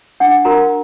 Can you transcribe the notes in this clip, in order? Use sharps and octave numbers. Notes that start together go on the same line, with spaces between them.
D4 F#5
F#4 A#4 A#5